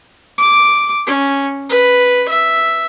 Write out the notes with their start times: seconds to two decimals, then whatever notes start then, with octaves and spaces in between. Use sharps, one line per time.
0.38 D6
1.07 C#4
1.69 B4
2.29 E5